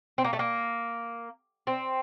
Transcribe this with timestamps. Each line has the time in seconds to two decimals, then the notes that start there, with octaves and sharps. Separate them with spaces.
0.18 C4
0.24 A#3
0.33 A3
0.39 A#3
1.67 C4